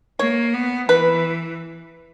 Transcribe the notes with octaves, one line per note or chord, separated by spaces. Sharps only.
A#3 C#5
B3
E3 B4